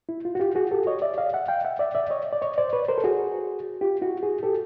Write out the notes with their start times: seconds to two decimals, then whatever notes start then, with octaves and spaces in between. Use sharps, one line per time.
0.09 E4
0.25 F4
0.35 F#4
0.40 F4 G4
0.55 F#4 G#4
0.71 G4 A4
0.87 C#5 D#5
1.02 D5 E5
1.18 D#5 F5
1.34 E5 F#5
1.48 F5 G5
1.65 E5 F#5
1.79 D5 E5
1.95 D5 E5
2.10 C#5 D#5
2.33 D5
2.42 C#5 D#5
2.58 C5 D5
2.73 B4 C#5
2.88 A#4 C5
2.98 A4
3.04 F#4 G#4
3.81 F4 G4
4.02 E4 F#4
4.23 F#4 G#4
4.43 G4 A4